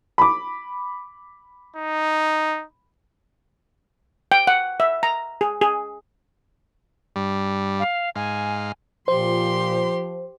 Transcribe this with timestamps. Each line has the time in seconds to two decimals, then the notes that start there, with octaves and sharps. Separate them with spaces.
0.18 B5 D6
1.76 D#4
4.32 G5
4.47 F#5
4.80 E5
5.03 A#5
5.41 G#4
5.62 G#4
7.16 G2 G3
7.79 F5
8.16 G#2 F5 G#5
9.08 A#2 F3 G4 C5 C6